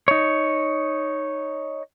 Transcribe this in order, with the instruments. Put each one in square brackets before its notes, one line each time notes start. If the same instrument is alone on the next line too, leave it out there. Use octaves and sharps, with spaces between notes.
[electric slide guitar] D#4 C#5